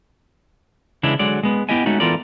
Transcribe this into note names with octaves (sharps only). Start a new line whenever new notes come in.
C#3 E3 G#3 D4 E4
D3 F#3 G#3 D5
G#3 B3
B3 E4 G4 D#5 G#5
G#3 A3 C#4 D#4 F#4
E3 B3 F4 A4 A#4 D5